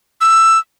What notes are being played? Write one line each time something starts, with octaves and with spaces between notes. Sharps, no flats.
E6